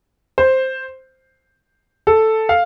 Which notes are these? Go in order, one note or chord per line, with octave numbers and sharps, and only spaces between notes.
C5
A4
F5